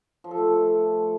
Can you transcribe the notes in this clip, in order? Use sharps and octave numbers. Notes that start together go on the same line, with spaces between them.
F3
A4
A3